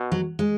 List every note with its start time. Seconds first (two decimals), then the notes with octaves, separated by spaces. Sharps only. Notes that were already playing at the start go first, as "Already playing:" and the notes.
Already playing: B2
0.12 F#3
0.39 G#3